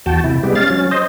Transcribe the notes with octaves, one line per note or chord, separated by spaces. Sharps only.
E2 F#4 G5 A5
C3 E4
G3 G#3 B3 G4
C#4 F5 A6
F#3 C#4
C5 D#5